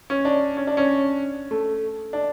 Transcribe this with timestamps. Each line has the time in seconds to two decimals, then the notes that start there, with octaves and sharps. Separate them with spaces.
0.10 C#4
0.25 D4
0.57 C#4
0.67 D4
0.77 C#4
1.51 A3
2.13 D4